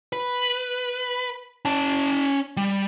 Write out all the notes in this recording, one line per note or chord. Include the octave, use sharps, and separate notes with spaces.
B4
C#4 A5
G3